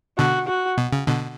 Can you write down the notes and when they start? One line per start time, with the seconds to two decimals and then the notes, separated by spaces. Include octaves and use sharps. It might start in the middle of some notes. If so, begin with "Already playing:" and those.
0.18 B2 D3 F#4
0.48 F#4
0.78 B2
0.92 C#3
1.07 B2 D3